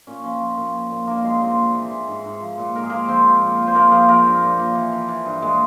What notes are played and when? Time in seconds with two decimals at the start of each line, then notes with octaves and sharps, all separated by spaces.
0.07 A#2 C#4
0.23 F3 C#4
0.40 F3
0.57 A#2
0.73 F3
0.91 A#2
1.07 G2 A#3 A#4
1.24 F3 G#3 G#4
1.41 A#2 C4 C5
1.58 A#2
1.75 E3
1.91 E3
2.08 G#2
2.24 G#2
2.41 F3
2.58 A#2
2.75 G#2 A#4
2.83 G#4
2.90 F3 A#3 A#4
3.08 F3 C4 C5
3.25 F3
3.42 A#2
3.59 A#2
3.67 C5
3.75 F3 A#3 A#4
3.87 F3 A#3 G#4 A#4
4.08 F3 A#3 A#4
4.26 G2
4.43 A#2
4.59 F3
4.75 E3
4.92 E3
5.09 E3
5.26 G2
5.42 A#2 G#3 G#4